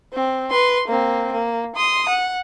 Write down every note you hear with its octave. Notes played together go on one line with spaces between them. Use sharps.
C4
B4 C6
A#3 C4
A#3
C6 D#6
F#5